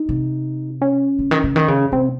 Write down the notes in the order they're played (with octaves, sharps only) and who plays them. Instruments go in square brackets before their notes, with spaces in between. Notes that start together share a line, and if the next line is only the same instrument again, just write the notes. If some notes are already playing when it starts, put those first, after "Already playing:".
Already playing: [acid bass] D#4
[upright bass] C3
[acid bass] C#4
[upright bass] C#3
D#3
C#3
D#3
C#3
[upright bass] C3 [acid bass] C4